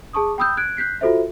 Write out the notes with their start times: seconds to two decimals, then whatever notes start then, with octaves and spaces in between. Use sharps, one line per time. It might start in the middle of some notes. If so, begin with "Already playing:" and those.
0.13 G#4 A5 C#6 D#6
0.38 G5 B5 D#6 E6 G6
0.57 F#6 G#6 D7
0.77 F#6 G6 B6 C7
1.01 F4 F#4 A4 C5 E5